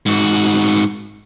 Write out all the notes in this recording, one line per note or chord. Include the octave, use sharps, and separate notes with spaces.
G#2 F#4